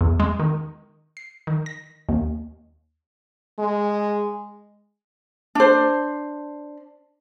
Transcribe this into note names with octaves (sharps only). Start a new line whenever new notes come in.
E2
G#3
D#3
C7
D#3
A#6
D#2
G#3
D4 C5